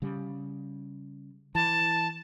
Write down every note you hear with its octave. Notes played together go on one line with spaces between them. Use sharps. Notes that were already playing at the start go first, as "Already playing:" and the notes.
C#3 G3
E3 A5